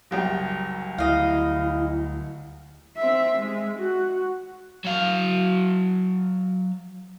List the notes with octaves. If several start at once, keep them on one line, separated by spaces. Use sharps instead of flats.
F#1 C2 G5
D2 E4 D#5 F5
C4 E5
G#3
F#4
F#3 F5